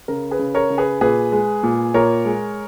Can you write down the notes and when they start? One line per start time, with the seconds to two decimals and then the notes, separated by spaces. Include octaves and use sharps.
0.08 C#3 A#4
0.31 G#4 B4
0.39 C#3
0.55 A#4 C#5
0.70 C#3
0.78 G#4 B4
1.01 A#2 G#4 B4
1.32 G#3
1.63 A#2
1.94 A#2 A#4 C#5
2.25 G#3